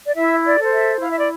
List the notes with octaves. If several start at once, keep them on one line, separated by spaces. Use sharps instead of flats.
D5
E4 E5
D5
A4 C5
E5
E4 F5
E5
D5